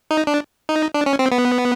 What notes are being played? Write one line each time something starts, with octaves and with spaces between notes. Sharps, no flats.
D#4
D4
D#4
D4
C#4
C4
B3